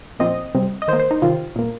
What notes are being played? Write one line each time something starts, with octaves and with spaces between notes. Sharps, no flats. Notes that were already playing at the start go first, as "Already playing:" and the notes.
A#2 F3 C4 D#5
C3 G3 C4
D#5
D#3 C5
A#3
C5
D#4
C3 D#3 C4 F4
A#2 A#3